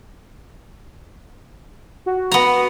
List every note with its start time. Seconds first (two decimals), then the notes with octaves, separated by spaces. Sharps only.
2.06 F#4
2.32 B3 A#5